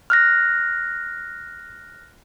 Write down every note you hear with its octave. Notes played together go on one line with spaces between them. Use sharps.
F6 F#6 A#6